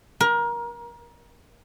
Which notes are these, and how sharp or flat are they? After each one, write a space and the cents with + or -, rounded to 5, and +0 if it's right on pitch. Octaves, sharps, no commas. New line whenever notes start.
A#4 +25